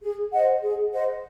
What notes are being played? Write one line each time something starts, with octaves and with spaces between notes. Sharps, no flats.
G#4
C5 D#5 F#5
G#4
C5 D#5 F#5